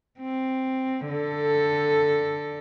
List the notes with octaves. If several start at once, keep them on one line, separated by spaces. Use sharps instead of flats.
C4
D3 A4